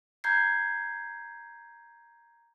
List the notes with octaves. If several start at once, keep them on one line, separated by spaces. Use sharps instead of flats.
A#5 G6 G#6 C7